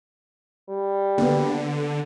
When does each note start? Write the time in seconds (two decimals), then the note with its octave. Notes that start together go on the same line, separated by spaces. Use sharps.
0.69 G3
1.18 D3 A#3 B3